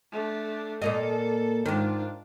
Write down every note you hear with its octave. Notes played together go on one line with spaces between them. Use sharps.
A3 D4
A#2 A#3 A4 D#5
G#2 D#3 D4 F4